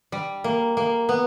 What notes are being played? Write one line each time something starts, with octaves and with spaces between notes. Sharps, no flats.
G3
A#3
A#3
B3